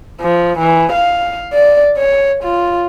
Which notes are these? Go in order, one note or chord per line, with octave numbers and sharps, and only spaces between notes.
F3
E3
F5
D5
C#5
F4